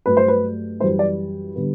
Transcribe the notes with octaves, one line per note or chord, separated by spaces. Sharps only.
G2 F#3 A3 B4
C5
B4
F#2 E3 G3 C5
D5
D3 G3 B3